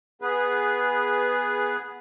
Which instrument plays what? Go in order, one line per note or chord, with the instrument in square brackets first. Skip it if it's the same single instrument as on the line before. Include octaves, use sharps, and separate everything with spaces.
[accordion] B3 G#4 B4